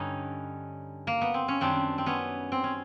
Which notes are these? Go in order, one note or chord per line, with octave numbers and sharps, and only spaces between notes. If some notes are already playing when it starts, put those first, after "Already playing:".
Already playing: G2 D3 G3 C#4 D#4
A#3
B3
C4
C#4
F#2 D#3 G3 C4 D4
C4
B3 C#4
C4
C#4